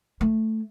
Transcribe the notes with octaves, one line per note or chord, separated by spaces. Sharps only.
A3